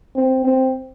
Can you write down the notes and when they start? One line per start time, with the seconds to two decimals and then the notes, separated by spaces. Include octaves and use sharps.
0.15 C4
0.44 C4